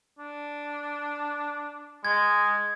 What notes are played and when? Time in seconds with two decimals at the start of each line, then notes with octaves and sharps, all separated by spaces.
0.19 D4
2.05 G#3 G#6